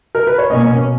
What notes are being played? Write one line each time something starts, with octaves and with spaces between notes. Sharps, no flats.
A#4
B4
C#5
B2 A#3 C#4 D#5